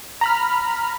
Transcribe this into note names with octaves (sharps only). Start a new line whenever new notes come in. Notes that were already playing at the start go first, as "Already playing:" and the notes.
A#5 B5 F6